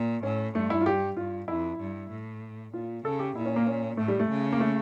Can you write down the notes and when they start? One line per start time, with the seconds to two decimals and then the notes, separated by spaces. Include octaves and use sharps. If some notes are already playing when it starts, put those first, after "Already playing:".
Already playing: A#2
0.23 A2 C#4
0.55 G2 A3
0.70 E4
0.81 F4
0.86 G4
1.17 G2 F4
1.48 F2 E4
1.79 G2
2.10 A2
2.73 A#2 F4
3.04 C#3 A4
3.19 G4
3.36 A#2 E4
3.45 C#4
3.56 A#3
3.67 C#4
3.97 A2 A3
4.08 G3
4.19 A3
4.29 C#3
4.53 A#3
4.60 A3